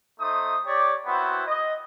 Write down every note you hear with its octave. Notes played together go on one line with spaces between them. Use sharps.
A3 D#4 C5 D#6
G4 C#5 D5
B3 C4 E4 F#4 C5
D#5